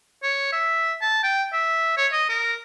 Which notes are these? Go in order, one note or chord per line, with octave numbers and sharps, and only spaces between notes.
C#5
E5
A5
G5
E5
C#5
D#5
A#4